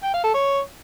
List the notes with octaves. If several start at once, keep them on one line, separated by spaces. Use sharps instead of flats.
G5
F5
A4
C#5